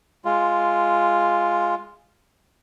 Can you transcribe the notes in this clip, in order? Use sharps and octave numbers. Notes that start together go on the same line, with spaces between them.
G#3 F4